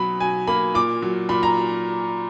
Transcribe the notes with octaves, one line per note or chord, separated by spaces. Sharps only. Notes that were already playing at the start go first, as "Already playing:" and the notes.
Already playing: B2 F#3 B5
B2 G#5
A#3 B5
A#2 D6
F#3
A#2 B5
A#5